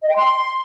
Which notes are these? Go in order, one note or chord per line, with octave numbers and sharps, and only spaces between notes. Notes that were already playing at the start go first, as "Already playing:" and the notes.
D#5
G5
C6